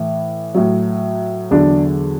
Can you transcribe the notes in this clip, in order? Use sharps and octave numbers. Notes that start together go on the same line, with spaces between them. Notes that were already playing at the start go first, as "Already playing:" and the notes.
Already playing: A2 E3
A2 F#3
E2 D3 F#3 D4